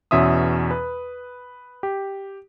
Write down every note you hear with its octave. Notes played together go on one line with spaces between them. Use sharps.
E2 B2 C#4 E5 C6 D#6
B4
G4